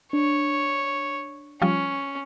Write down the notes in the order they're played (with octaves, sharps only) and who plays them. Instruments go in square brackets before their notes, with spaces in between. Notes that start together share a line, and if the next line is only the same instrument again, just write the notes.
[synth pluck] D4 [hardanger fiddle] C#5
[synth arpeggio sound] F3 G3 F4 [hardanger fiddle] C#4